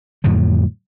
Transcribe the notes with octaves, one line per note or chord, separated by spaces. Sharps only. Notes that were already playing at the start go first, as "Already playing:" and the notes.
F2 A2 D3 F#3